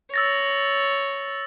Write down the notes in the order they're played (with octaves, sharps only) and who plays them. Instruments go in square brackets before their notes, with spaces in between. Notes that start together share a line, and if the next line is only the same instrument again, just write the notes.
[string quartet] C#5 [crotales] E6 A6 A#6